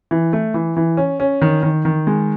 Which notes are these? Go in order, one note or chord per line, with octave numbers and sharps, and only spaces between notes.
E3
A3
E3
E3
C#4
C#4
D#3
D#3
D#3
G#3